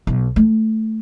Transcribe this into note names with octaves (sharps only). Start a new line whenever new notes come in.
B1
A3